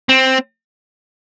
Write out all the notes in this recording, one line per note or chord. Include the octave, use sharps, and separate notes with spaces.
C4